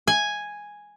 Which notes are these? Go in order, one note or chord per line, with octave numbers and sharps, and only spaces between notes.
G#5